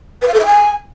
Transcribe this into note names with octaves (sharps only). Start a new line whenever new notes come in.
B4
F5
A4
E5
G#5